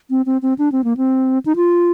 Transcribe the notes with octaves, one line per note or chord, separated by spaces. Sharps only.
C4
C4
C4
D4
C4
A#3
C4
D#4
F4